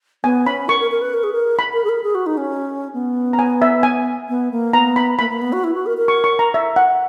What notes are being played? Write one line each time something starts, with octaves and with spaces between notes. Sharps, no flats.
B3 G#5
C#4 B5
A#4 C#6
A#4
A#4
B4
A#4
G#4
A#4
B5
A#4
G#4
A#4
G#4
F#4
D#4
C#4
B3
A#5
G#5
E5
G#5
B3
A#3
B3 A#5
B5
A#3 B5
A#3
B3
F#4
E4
F#4
A#4
A#4
C#6
C#6
A#5
E5
F#5